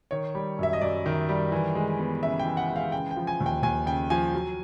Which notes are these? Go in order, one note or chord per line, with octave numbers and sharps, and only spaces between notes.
D#3 C#5
G3
F#2 E5
D#5
F#2 D5
D#3
G3
E3
G#3
B3
C#3 E5
G5
E3
F#5
G#3
F5
C#3 G5
G5
F3
G#5
D#2
G5
D#2 G#5
C#3 G5
F3 G#5
F#3